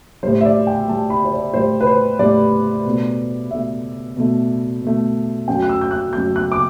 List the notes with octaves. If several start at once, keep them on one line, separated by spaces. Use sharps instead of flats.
A2 G3 C5
E5
D5
G5
A2 G3 A5
B5
C5
D5
A2 G3 C5
B4
C5
A2 G3 D5
B2 A3
B2 A3 E5
B2 A3
B2 A3
F#2 F#3 A3 G5
F#6
E6
G6
F#6
F#2 F#3 A3 G6
F#6
D6